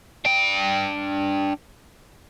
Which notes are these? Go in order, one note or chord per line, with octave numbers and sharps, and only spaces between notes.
D4 G5